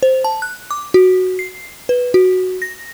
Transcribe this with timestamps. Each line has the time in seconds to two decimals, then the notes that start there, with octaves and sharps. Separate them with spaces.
0.03 C5
0.24 A5
0.42 F#6
0.71 D6
0.94 F#4
1.39 C7
1.89 B4
2.14 F#4
2.62 A#6